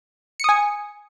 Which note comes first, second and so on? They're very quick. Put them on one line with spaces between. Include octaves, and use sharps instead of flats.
C#7 D#6 G#5